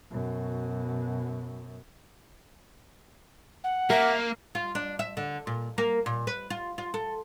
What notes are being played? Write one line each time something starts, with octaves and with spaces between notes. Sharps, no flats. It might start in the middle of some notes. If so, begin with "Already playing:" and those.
F#2 B2
F#5
A#3 A#4 E5
F4
D4
E5
D3
A#2
A#3
A#2
B4
F4
F4
A4